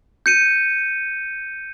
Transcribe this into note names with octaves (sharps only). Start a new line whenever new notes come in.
G6 C#7 D#7